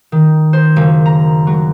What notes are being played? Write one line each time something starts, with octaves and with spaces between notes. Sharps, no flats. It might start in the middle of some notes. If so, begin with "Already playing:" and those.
D#3
C5
F#1
A#5
F#3